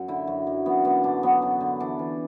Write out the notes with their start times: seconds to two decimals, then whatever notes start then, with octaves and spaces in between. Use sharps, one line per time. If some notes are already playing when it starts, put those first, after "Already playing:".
Already playing: F#2 F#4
0.08 D3 E4
0.27 F#2
0.47 F#2
0.66 F#2 B3
0.85 F#2 B3
1.04 D3 D4
1.23 F#3 B3
1.42 F#2
1.61 D3
1.80 E3 D4
1.99 E3